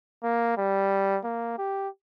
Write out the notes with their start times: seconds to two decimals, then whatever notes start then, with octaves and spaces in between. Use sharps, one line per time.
0.23 A#3
0.58 G3
1.24 A#3
1.58 G4